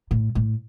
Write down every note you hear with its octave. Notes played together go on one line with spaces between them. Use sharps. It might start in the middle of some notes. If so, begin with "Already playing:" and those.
A2
A2